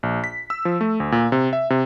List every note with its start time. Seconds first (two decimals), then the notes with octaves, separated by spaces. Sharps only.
0.03 A#1
0.24 B6
0.50 E6
0.65 F3
0.81 A3
1.00 D2
1.12 A#2
1.32 C3
1.53 E5
1.70 C3